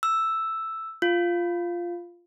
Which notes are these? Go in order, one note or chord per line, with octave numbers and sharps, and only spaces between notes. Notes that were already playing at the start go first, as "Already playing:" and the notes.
E6
F4